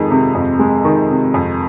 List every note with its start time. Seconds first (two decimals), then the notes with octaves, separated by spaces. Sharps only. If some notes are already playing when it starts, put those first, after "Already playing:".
Already playing: F2 D#3 G#3
0.11 C3
0.35 F2
0.59 G#3
0.85 D#3
1.10 C3
1.34 F2